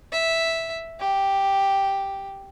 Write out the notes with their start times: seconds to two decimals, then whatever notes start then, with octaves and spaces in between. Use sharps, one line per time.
0.12 E5
0.99 G4